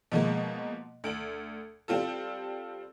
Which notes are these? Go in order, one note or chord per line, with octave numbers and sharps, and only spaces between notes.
B2 F3 G#3 A#3
D2 D7 F#7
G3 C4 F4 A4